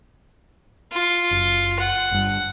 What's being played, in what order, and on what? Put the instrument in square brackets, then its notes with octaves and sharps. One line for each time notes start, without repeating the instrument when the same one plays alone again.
[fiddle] F4
[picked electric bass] F#1
[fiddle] F#5
[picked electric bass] G1 G2